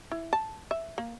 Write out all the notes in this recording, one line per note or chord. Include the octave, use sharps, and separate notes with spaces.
E4
A5
E5
A#3